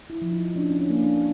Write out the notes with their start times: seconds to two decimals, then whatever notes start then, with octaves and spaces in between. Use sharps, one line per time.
0.10 E4
0.22 F3
0.32 D#4
0.55 C#4 D4
0.70 C#4
0.79 D4
0.90 A#3
1.02 D4